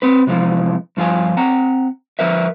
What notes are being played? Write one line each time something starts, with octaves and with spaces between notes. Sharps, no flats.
C4 B4
C3 E3 F3 G#3
G2 F3 F4 G4 G#5
C4 F#5 A#5
F3 A#4 B4 E5